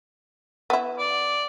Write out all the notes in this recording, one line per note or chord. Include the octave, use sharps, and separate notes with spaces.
B3 E4
D5